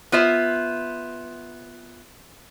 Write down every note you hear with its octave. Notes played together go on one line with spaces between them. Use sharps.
B3 F4 C5 E5